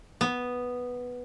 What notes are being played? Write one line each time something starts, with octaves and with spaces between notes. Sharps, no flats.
B3